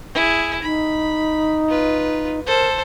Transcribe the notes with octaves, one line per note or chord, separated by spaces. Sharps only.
E4 G#4
D#4 B5
F4 B4
A4 A#4 C5